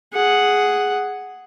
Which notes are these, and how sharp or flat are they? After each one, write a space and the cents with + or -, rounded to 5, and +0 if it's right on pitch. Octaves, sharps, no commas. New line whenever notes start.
G#4 +0 F#5 +0